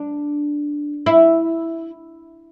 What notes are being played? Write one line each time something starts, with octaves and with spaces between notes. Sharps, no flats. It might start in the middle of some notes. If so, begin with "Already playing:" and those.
Already playing: D4
E4